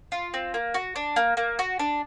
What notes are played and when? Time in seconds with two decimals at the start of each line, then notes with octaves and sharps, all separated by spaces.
0.12 F4
0.34 C4
0.54 A#3
0.74 F#4
0.96 D4
1.16 A#3
1.37 A#3
1.59 F#4
1.79 D4